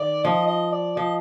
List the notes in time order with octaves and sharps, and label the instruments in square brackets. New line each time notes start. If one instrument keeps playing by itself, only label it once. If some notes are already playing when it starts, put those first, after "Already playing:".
Already playing: [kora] D#3 [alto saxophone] D5
[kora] F3 [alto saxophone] D#5
[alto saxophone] D#5
D5
[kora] F3 [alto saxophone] D#5